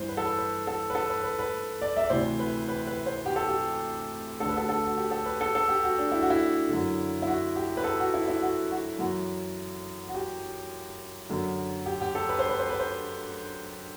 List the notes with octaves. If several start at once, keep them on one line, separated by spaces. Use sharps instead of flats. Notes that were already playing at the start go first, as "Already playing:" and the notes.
Already playing: G2 E3 C5
B4
A4
B4
B4
A4
B4
A4
B4
B4
B4
D5
E5
D5
D2 C3 E3 C5
B4
B4
B4
C5
G4
A4
G4
D2 D3 A4
B4
A4
A4
F#4
G4
A4
B4
A4
A4
G4
F#4
D4
E4
F#4
E4
F#2 D3
E4
F#4
G4
B4
A4
F#4
E4
E4
F#4
F#4
F#2 E3 F#4
F#4
G4
F#2 D3
G4
G4
A4
B4
C5
B4
C5
B4
C5